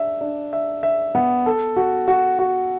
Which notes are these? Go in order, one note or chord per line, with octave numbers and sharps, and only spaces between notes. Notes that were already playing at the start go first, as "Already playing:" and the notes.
Already playing: D4 E5
D4
E5
E5
B3
A4
F#4
F#4
F#4